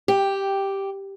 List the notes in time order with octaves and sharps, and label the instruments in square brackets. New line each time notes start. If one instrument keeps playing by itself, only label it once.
[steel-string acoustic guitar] G4